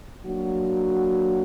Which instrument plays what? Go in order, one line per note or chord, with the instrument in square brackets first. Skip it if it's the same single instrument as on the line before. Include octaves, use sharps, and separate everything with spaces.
[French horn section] F#3 A#3 D4 F#4